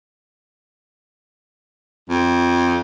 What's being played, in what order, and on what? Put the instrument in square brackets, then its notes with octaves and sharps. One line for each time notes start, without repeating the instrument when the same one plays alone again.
[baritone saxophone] F2